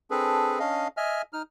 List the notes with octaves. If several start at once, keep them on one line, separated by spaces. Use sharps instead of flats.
C4 D4 G#4 A4 B4
C#4 D4 D#5 F5
D#5 E5 G#5 F6
D#4 F6